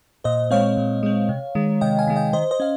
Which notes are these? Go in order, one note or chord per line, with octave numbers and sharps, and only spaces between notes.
A#2 C5 D#5
G#3 C4 C#5 F5
A#2
G#3 C4
C3
D#3 G#3
C3 D#5 G5
F5 G#5
D#3 G#3
D#5 G5
D#3 C5 D#5
C5 D#5
C#4 F5